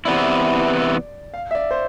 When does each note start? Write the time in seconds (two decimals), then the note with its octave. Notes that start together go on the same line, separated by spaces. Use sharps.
0.05 C3 E3 B3 E4 D5
1.34 F5
1.51 E5
1.55 D5
1.71 C5